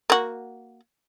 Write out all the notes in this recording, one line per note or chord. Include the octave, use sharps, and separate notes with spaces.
A#3 F#4